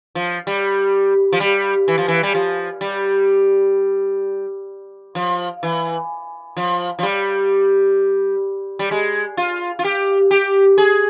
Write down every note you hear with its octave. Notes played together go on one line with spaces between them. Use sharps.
F3
G3
F3
G3
E3
F3
E3
G3
F3
G3
F3
E3
F3
F3
G3
G3
G#3
F4
F4
G4
G4
G#4